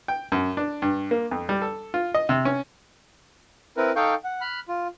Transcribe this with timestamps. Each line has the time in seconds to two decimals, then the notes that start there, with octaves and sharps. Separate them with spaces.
0.08 G5
0.32 F#2
0.57 D4
0.82 G2
1.11 A#3
1.31 F2
1.49 G3
1.62 A4
1.94 F4
2.14 D#5
2.29 C3
2.45 C#4
3.77 C4 E4 A#4 B4
3.96 D#4 A4 F5 G5 C#6 G6
4.24 F#5
4.41 B5 F6 F#6
4.68 F4